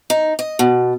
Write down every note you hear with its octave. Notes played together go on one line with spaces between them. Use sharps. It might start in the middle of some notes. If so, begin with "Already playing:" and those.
D#4
D#5
B2